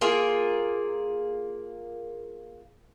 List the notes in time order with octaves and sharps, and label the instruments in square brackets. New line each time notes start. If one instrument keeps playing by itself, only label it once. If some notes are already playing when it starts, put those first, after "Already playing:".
[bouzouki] A#3 F4 G#4 A#4